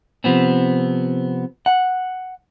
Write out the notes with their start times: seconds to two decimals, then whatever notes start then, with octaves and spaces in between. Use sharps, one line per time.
0.24 C3 F3 B3 C4
1.66 F#5